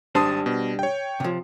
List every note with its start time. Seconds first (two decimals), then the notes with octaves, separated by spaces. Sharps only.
0.15 G#1 G3 D4 C5 A5 D#6
0.46 B2
0.79 C#5 G5
1.20 C3 F3